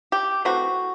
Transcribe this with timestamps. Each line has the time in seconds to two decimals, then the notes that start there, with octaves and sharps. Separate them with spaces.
0.12 G4
0.45 E3 A3 C4 F#4